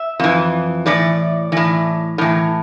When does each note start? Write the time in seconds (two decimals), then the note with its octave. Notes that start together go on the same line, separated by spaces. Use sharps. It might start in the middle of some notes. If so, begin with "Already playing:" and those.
Already playing: E5
0.19 F2 E3
0.86 A2 E3 D5
1.52 A2 E3
2.18 A2 E3